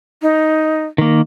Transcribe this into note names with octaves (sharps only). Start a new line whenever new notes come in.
D#4
D#3 A#3